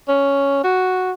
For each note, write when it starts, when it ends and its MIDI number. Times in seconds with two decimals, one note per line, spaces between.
0.08 0.60 61
0.64 1.12 66